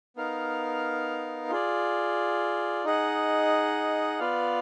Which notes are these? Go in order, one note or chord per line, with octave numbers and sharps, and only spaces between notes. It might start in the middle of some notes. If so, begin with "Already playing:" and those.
B3 D#4 A#4 F5
F4 G#4 D5
D#4 G#4 D#5 F#5
B3 F4 B4 D5 F5